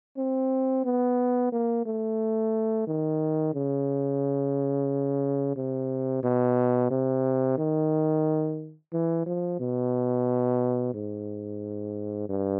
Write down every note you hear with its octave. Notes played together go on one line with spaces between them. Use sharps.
C4
B3
A#3
A3
D#3
C#3
C3
B2
C3
D#3
E3
F3
B2
G#2
G2